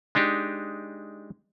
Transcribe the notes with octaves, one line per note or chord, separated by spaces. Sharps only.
G#3 D4 D#4 G4